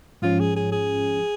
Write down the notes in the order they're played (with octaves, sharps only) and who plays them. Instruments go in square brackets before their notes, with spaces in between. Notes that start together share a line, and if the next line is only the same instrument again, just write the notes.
[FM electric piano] G#2 F3 C#4 [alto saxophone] F4
[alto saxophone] G#4
G#4
G#4